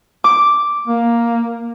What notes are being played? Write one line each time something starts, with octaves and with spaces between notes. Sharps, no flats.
D6
A#3